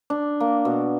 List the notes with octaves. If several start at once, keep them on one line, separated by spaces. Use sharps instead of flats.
D4
A#3
B2